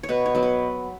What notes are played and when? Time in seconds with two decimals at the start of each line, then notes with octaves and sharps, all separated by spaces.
0.03 C#5
0.09 B2 B4
0.26 C#5
0.35 F#3 B3
0.43 B4